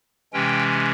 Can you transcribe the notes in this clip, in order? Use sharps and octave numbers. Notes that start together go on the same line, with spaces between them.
C3 E3 G#3 C#4 G5